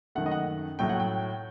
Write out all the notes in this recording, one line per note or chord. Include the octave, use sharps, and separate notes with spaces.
F#2 D#3 A3 F#5
D#5
F#5
A2 F#3 A3 G5
F#5
G5